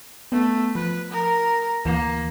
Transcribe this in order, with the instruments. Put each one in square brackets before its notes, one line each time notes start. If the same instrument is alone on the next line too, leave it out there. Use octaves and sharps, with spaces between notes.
[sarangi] A3 [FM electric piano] B3
[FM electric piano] F3 [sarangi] B4
[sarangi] A#4
[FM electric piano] D2 E3 [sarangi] A#3